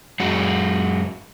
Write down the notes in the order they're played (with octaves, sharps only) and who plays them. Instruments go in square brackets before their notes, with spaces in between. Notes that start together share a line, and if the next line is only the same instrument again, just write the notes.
[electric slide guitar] F#2 G#3 F#4